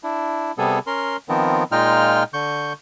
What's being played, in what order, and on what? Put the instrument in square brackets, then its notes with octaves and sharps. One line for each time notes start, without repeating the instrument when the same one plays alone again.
[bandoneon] D4 E4
C3 G3 B3 G#4 A4
C#4 A#4 C6
D#3 F3 B3 C4
A#2 G#3 D#4 F4 G5 F6
D3 C#6 G6